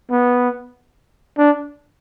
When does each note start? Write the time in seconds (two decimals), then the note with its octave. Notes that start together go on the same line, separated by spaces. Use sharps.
0.11 B3
1.38 D4